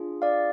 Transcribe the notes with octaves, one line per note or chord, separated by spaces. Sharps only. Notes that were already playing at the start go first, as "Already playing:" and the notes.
Already playing: D4 F4 G#4
D5 F5